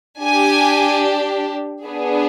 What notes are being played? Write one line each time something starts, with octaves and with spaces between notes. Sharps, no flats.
D4 G4 G#5
B3 D4 G#4